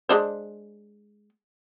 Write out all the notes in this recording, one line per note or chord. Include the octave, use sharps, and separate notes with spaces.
G#3 D4 C5